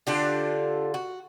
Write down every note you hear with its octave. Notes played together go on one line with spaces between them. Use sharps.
D3 D4 F4 G4 A4
F#4